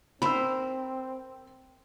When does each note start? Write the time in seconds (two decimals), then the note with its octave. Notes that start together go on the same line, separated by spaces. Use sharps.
0.22 C4 A#4 C5 B5 E6